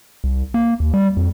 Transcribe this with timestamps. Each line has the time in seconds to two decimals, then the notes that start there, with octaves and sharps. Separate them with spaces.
0.24 C2
0.54 A#3
0.80 D#2
0.94 G3
1.17 F2